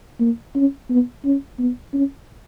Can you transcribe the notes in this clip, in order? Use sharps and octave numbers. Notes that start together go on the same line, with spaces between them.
A#3
C#4
B3
C#4
B3
C#4